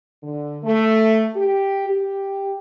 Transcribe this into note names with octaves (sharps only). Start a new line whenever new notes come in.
D3
A3
G4
G4